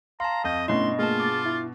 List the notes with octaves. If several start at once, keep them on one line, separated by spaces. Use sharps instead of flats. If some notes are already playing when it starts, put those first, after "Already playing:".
F5 A5 A#5 C6
F2 C4 D#5 G6
G2 B2 A3 C#4 E4 D#5 C6
A3 A#3 F4 G#4 A5
D6 A6
E4